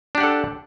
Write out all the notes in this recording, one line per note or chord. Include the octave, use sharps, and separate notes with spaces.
D4 G4 A4 F#5